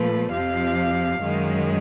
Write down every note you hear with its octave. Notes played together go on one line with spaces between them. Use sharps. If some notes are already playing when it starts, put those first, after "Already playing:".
Already playing: A#2 F3 A3 B4
F2 C3 F3 F5
F#2 D#3 G#3